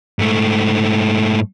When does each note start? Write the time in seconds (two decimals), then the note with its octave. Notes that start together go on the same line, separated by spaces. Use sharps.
0.19 G#2 A3